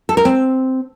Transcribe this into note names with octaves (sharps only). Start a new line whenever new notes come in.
A4
A#4
C4